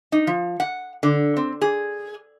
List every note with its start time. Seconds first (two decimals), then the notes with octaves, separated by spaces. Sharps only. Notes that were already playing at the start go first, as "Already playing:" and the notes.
0.12 D#4
0.27 F3
0.60 F#5
1.03 D3
1.37 C4
1.62 G#4